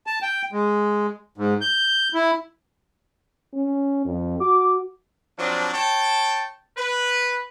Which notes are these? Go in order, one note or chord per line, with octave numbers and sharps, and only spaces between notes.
A5
G5
G#3
G#2
G6
E4
C#4
F2
F#4 D6
F3 F#3 C4 D4
C#5 G5 A5
B4